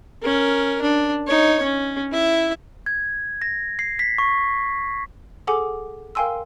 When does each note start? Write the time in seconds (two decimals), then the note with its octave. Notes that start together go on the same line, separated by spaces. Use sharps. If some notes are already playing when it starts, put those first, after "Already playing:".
0.22 C#4 A#4
0.82 D4
1.27 D#4 C#5
1.63 C#4
2.12 E4 E5
2.86 G#6
3.42 A#6
3.79 C7
3.99 B6
4.18 C#6
5.47 G#4 A4 F#5 G#5 D6
6.15 A#4 F5 G5 G#5 C6 E6